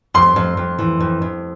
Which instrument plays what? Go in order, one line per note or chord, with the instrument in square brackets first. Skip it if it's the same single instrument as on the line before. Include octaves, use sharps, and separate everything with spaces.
[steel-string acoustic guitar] F2 [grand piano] C6
[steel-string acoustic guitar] F2
F2
E3
F2
F2